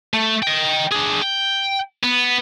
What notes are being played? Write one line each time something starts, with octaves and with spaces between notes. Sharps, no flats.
A3
D#5 G5
D4 G#4
G5
B3